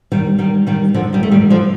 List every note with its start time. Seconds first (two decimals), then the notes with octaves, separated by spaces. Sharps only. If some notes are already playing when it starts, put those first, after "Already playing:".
0.12 D#3 G3
0.39 D#3 G3
0.67 D#3 G3
0.94 D3 F3
1.13 D#3 G3
1.23 A3
1.31 D#3 G3
1.50 D3 F3